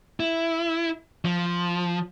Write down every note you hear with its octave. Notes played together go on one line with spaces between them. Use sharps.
E4
F3